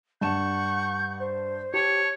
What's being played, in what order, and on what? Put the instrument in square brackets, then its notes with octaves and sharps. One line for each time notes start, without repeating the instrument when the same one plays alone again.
[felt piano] G2 A5 E7 [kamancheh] F#5 C#6 [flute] G6
[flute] C5
[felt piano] G4 [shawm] C#5 [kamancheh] A5